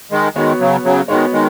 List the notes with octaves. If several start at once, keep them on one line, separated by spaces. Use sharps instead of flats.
D#3 G#3
D#3 G#3 B3 F#4 C#5
C#3 F#3
C#3 F#3
D#3 G#3 B3 F#4 C#5
D#3 G#3